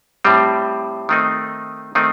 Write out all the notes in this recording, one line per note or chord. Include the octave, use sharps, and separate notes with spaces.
A2 G3 C4
D#3 A3 C4 D#4
D#3 A3 C4 D#4